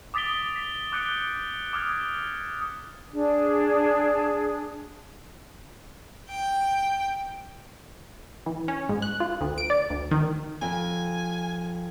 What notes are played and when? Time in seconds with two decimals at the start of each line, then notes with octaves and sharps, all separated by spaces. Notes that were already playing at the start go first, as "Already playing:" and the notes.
0.14 D6 D#6 A6 B6 D7 G7
0.56 B6
0.92 D6 F#6 G6 C#7 D7 G7
1.73 D6 D#6 F6 G#6
3.12 D4 G#4
6.29 G5
8.46 E3
8.68 C#4
8.89 G#2
9.02 F#6
9.20 F4
9.41 D2
9.58 D7
9.70 D5
9.90 D2
10.11 D#3
10.62 F2 G#5